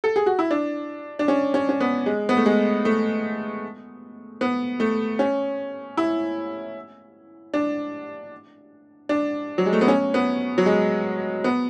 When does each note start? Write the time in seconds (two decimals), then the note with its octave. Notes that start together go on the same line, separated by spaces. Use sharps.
0.04 A4
0.16 G#4
0.26 F#4
0.39 E4
0.51 D4
1.19 D4
1.28 C#4
1.54 C#4
1.69 C#4
1.81 B3
2.06 G#3
2.29 B3
2.37 A3
2.46 G#3
2.85 A3
4.41 B3
4.80 A3
5.19 C#4
5.97 E4
7.54 D4
9.09 D4
9.58 F#3
9.66 G#3
9.73 A3
9.81 B3
9.88 C#4
10.14 B3
10.58 F#3
10.66 G#3
11.44 B3